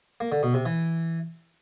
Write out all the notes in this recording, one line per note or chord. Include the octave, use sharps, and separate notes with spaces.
A#3
D3
B2
C3
E3